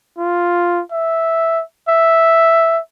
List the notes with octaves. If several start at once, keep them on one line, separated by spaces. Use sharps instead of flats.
F4
E5
E5